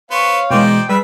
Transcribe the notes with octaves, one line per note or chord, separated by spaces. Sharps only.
B3 C5 C#5 F5
B2 E3 G#3 D#4 C5 D5 G5
G3 G#4 B4 E5